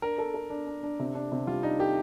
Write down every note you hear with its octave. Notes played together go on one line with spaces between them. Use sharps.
D4 A#4
A4
A4
D4
D4
D4
C3
D4
C3
G3 F4
D4 D#4
G4 A4